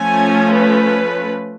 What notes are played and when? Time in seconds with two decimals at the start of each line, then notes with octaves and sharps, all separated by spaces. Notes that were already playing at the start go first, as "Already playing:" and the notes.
Already playing: F3 A3 C#4 G#5
0.55 B4